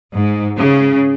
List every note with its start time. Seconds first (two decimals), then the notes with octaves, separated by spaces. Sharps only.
0.14 G#2
0.58 C#3